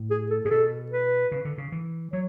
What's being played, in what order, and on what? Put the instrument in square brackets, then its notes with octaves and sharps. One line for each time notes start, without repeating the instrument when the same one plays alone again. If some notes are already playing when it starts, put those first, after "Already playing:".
Already playing: [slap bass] A2
[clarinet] G#4
A4
[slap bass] A2 [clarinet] G#4
[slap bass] B2 [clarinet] A4
[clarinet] B4
[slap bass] C#3
D3
C#3
E3
[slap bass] F#3 [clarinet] C#5